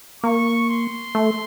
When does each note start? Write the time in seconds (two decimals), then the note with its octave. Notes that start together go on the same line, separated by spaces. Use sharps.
0.24 A#3 C#6
0.69 C6
1.15 A3